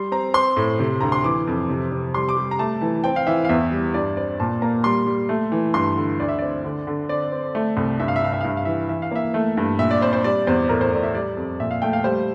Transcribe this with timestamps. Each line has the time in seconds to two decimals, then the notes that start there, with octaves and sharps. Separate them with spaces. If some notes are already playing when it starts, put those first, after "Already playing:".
Already playing: G3 C6
0.12 C4 A#5
0.34 C4 C6
0.56 A2
0.79 C3
1.00 D2 A#5
1.12 C6
1.24 E3 D6
1.47 F2
1.70 C3
1.92 C3
2.14 G3 C6
2.29 D6
2.37 G3
2.51 A#5
2.59 A3 A5
2.81 E3
3.04 C4 G5
3.16 F5
3.27 E3 E5
3.45 F5
3.49 E2 E5
3.71 G3
3.94 G2 D5
4.17 C4 D5
4.40 A#2 A5
4.62 A#3 A#5
4.84 G3 C6
5.06 G3
5.29 A3
5.52 E3
5.74 G2 C6
5.97 D3
6.20 D2 D5
6.29 E5
6.39 C4 D5
6.64 D3
6.87 D3
7.09 C4 D5
7.32 C4
7.55 A3
7.77 C2
7.99 G2 E5
8.08 F5
8.16 E5
8.22 G2 F5
8.33 E5
8.41 F5
8.44 G2 E5
8.57 F5
8.65 E3 E5
8.89 E3 E5
9.02 F5
9.11 A#3 E5
9.34 A3
9.57 G2
9.79 A#2 E5
9.91 D5
10.01 C4 C5
10.13 C5
10.24 G3 D5
10.47 E2 C5
10.69 A2 A#4
10.81 C5
10.92 A2 D5
11.03 E5
11.14 G3 D5
11.37 F2
11.60 A#2 E5
11.71 F5
11.82 A3 G5
11.93 F5
12.04 G3 C5